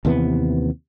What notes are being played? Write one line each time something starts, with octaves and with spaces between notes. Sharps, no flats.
D#2 C3 E3 B3